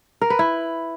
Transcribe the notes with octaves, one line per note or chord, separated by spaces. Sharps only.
A#4
B4
E4